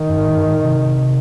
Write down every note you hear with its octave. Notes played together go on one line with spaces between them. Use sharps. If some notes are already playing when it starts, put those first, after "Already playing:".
Already playing: D#3
F#2
G#2
A2
F#2
G#2
A2
C3